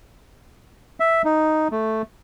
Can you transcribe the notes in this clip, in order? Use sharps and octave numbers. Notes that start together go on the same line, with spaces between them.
E5
D#4
A3